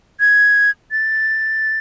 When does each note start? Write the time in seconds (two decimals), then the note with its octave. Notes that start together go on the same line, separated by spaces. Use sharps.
0.20 G#6
0.91 A6